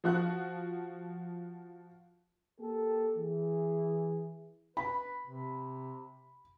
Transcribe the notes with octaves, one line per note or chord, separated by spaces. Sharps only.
F3 F#4 F#6
A#3 G4 A4
E3 G#4
B4 B5
C3